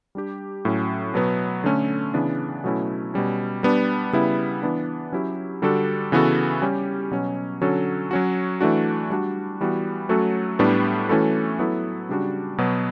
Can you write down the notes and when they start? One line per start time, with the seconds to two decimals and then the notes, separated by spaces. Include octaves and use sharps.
0.15 G3 D4 G4
0.65 A2 F#3 C#4
1.14 B2 F#3 B3
1.64 D3 A3 C#4
2.14 C#3 E3 B3 D4
2.64 B2 F#3 A3 C#4 E4
3.14 B2 G3 C#4
3.63 G3 B3 D4
4.13 C#3 G3 B3 E4
4.63 E3 B3 D4
5.12 F#3 C#4 E4 G4
5.62 D3 G3 D4 F#4 A4
6.12 C#3 E3 B3 F#4 A4
6.61 G3 C#4 G4
7.11 B2 F#3 C#4
7.61 D3 F#3 C#4 F#4 A4
8.11 F#3 C#4 F#4
8.61 E3 A3 D4 F#4
9.10 G3 D4 F#4
9.61 E3 G3 B3 F#4
10.09 F#3 A3 C#4 F#4 A4
10.59 A2 G3 B3 D4
11.09 E3 A3 C#4 F#4 A4
11.59 F#3 B3 E4 A4
12.09 C#3 G3 D4 F#4
12.58 B2 F#3 B3